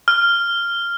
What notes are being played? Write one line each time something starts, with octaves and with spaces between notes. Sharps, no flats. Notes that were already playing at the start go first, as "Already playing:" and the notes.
F6